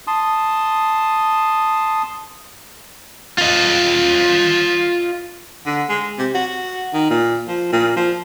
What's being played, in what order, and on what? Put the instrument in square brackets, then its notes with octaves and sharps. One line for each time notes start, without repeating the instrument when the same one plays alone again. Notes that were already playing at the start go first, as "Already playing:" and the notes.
[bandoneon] A5 C6 D#6
[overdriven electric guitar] F4 D#5
[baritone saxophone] D3
G#3
C3
F#4
D#3
A#2
F3
A#2
F3